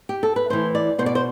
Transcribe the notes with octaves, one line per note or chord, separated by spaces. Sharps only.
G4
A4
B4
A2 E3 C5
D5
B2 C5
D5
C5